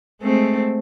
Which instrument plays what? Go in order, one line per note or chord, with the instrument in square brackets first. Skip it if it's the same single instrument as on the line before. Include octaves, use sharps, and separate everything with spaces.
[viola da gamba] G#3 A3 C4